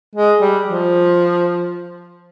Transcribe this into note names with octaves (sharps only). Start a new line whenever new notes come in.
G#3
G3
F3